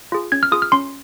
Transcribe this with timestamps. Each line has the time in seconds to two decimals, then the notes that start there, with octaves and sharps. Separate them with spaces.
0.12 F4 G#4
0.32 C#4 G#6
0.43 F6
0.52 F4 G#4 D#6
0.62 F6
0.72 C#4 C6